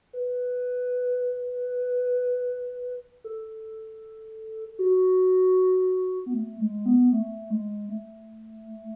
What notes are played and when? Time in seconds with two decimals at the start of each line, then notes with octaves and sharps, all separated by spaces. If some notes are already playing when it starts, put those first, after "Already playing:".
0.13 B4
3.24 A4
4.79 F#4
6.26 B3
6.34 A3
6.60 G#3
6.86 B3
7.12 A3
7.50 G#3
7.89 A3